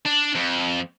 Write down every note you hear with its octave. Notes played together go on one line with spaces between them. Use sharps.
D4
F2